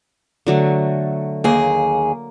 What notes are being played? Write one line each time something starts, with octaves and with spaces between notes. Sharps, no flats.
D3 F#3 A3
D#2 A#3 G#4